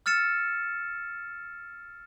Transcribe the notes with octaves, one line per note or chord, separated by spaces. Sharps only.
E6 F6 A6 C#7 E7